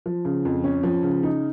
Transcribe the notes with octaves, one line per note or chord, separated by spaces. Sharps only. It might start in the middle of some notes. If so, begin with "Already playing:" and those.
F3
C#3
F2
C#4
F3
C#3
D#4